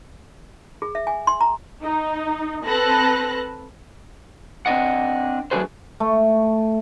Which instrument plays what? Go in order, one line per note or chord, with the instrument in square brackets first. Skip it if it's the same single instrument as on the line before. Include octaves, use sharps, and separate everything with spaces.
[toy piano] G#4
E5
G#5
C6
A#5
[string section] D#4
C4 A4 B4 A5 F#6 A#6
[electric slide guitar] C4 D4 D#5 F#5
F#3 A3 D4 G#4 B4 C5
[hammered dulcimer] A3